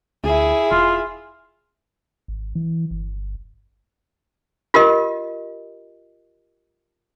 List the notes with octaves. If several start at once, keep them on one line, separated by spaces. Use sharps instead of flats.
D2 E4 G#4
E1 F4
G#1
E3
G1
F4 G4 A#4 D#5